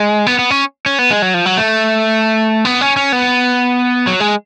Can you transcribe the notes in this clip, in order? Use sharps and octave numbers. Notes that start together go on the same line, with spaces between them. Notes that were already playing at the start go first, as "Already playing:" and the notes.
Already playing: G#3
B3
B3
C#4
C#4
B3
G#3
F#3
F3
F#3
A3
B3
C#4
C#4
B3
F#3
G#3